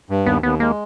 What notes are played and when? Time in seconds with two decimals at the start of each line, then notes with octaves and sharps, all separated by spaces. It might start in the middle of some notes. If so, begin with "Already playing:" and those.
0.10 G2
0.26 D#2 B3
0.43 D#2 B3
0.60 G#3 A#3